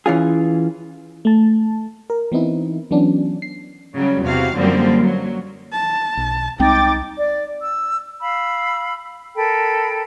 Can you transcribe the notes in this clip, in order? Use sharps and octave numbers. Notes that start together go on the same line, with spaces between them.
E3 C#4 F4 G#4
A3 A5
A#4
E3 B3 C4 D#4 E4
E3 F#3 B3 C#4 D4
C7
C#3 F#3 G3
E2 C3 F#4 F5
F#2 D3 F3 G3 A#3 C4
F#3
A5
B1
C2 G#3 C4 D#4 G5 D6 A6
D5
E6
F5 B5 E6
A4 A#4 G5 B5